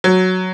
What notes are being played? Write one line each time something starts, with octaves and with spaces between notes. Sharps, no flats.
F#3